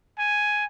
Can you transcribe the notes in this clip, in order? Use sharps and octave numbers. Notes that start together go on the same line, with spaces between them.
G#5